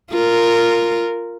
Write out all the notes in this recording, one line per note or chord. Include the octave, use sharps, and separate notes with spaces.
F4 A#4